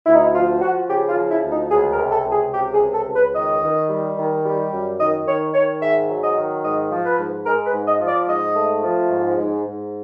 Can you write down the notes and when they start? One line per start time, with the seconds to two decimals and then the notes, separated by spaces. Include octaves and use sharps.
0.06 D2 E4
0.14 D#4
0.22 E4
0.34 F3 F4
0.61 F3 F#4
0.89 C#3 G4
1.08 F4
1.16 F3
1.30 E4
1.43 D2
1.51 D#4
1.70 C#2 G#4
1.92 A#4
1.98 C3
2.12 A4
2.25 C#2
2.32 G#4
2.53 C3 G4
2.74 G#4
2.80 C#2
2.94 A4
3.07 C#2
3.15 B4
3.35 D#3 D#5
3.62 D#3
3.89 G3
4.17 D#3
4.44 G3
4.72 F#2
4.99 D#3 D#5
5.26 D#3 C#5
5.54 D#3 C#5
5.81 G#2 E5
6.09 F#3
6.23 D#5
6.37 D#3
6.63 G#2 D#5
6.91 F3
7.04 B4
7.19 G#2
7.45 G#3 A#4
7.65 B4
7.72 G#2
7.87 D#5
8.00 F3
8.08 D5
8.27 G#2 D#5
8.55 A3
8.82 F3
9.09 G#2
9.36 G#2
9.65 G#2